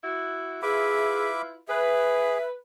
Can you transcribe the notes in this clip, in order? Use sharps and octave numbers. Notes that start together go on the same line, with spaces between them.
E4 F#4
E4 F4 G#4 B4 E5 B5 D6
G#4 B4 E5